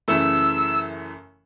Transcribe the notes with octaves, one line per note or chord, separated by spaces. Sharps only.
F#2 C#3 E3 A3 E6